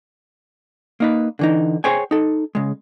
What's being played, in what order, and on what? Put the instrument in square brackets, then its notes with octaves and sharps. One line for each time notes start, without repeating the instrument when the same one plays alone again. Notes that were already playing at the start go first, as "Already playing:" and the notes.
[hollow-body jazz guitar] A#3 D#4 B4
D3 E3 D#4
G#4 C5 C#5 G5 G#5
D#4 A4
C#3 G#3